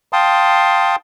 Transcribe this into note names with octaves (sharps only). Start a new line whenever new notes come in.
F5 G5 A5 C6 D#6